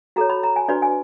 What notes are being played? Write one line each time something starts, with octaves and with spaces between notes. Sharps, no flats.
F#4 A4 C#5 A#5
B5
A#5
G#5
D4 F#4 B4 D5
G#5